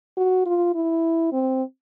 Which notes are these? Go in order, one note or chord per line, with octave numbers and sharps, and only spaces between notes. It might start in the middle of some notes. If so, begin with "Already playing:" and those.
F#4
F4
E4
C4